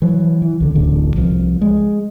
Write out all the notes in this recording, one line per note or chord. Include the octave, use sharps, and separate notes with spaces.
E3 F#3
E3
C2 D3
D1 A1 D3
C2 F3
G#3